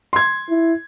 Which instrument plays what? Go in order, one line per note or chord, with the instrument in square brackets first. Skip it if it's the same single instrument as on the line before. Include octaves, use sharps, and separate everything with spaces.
[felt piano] C6 G#6
[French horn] E4